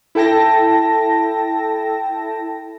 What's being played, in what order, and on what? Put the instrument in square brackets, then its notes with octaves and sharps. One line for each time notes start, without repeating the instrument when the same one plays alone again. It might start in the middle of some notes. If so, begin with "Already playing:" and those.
[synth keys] E4 A4 G5 A5 A#6